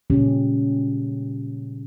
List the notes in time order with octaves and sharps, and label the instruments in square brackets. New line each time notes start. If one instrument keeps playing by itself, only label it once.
[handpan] A#2 C#3 G3 G#3 C#4 G4